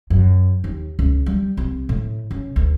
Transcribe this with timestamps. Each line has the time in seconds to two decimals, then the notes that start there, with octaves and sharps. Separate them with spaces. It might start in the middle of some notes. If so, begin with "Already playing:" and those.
0.10 F#2
0.64 D#2
0.99 C#2
1.26 G3
1.57 C2
1.89 A2
2.31 C#3
2.56 D2